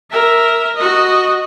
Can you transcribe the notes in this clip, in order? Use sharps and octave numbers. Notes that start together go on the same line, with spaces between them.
A#4 E5
F#4 D#5